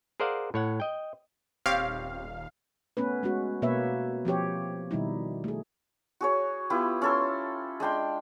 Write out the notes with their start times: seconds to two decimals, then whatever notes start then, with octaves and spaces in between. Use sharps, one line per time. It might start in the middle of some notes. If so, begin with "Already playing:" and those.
0.20 G#4 A#4 C5 D5 F5 F#5
0.54 A2 C#5 F#5
0.80 D#5 G5
1.66 D#1 C4 G4 C#5 F5
2.97 A3 B3 C#4 B4
3.23 G#3 C#4 F#4
3.62 B2 A#3 B4 C#5 E5
4.25 F3 C4 G4 C#5
4.91 B2 D#3 G3 D#4 E4
5.44 A3 G#4
6.21 F#4 G#4 C#5
6.70 B3 E4 F4 G4
7.02 C#4 A4 C6
7.80 G#3 D4 G5 C6